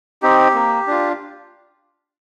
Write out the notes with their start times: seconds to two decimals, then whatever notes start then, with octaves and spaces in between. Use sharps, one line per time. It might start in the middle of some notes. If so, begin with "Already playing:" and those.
0.22 C4 D#4 G4
0.54 A#3
0.87 D4 F4